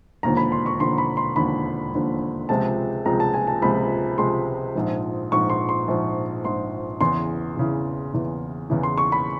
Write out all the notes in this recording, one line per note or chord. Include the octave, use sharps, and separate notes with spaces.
E1 D#2 D3 F3 A#5
B5
C6
C#6
E1 D#2 D3 F3 C6
B5
C6
E1 D#2 D3 F3 B5
E1 D#2 D3 F3
C#2 C3 F3 G#3 C4 A5
C#2 C3 F3 G#3 C4 A#5
A5
G#5
A5
C#2 C3 F3 G#3 C4 B5
C#2 C3 F3 G#3 C4 C6
A#1 G#2 F3
A#1 G#2 F3 C#6
C6
C6
A#1 G#2 F3
A#1 G#2 F3 C6
E2 C#3 E3 C6
E2 C#3 E3
E2 C#3 E3
E2 C#3 E3
C6
C#6
B5